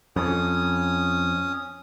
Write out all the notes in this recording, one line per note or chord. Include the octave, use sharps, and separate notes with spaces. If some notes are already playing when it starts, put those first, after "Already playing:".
F2 C#4 D#6